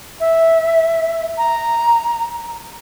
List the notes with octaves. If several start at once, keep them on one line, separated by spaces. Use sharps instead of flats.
E5
A#5